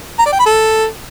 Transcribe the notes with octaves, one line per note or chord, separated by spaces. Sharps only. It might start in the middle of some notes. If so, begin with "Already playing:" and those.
A#5
D5
G5
B5
A4